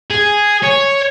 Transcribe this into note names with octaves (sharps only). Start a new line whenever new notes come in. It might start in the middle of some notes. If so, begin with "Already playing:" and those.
G#4
C#5